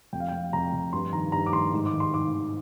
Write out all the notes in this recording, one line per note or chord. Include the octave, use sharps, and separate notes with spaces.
F2 G5
F5
F2 G5
F2 A#5
F2
G2 C6
D#3 A#5
G2 A#5
D6
D#3 C6
G#2
D6
D#3
C6
D#3 D6
D#3